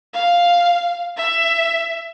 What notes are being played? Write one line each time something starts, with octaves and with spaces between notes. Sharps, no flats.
F5
E5